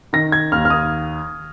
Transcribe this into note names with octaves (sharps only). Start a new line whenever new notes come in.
D#3 A#6
G#6
D#2 F6
F6
D#6